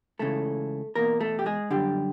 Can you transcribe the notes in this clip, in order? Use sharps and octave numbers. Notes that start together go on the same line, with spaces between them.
C#2 C#3 E3 A3 A4
E2 B2 A#3 A#4
A3 A4
G4
G#3 G#4
F#2 D3 G3 G4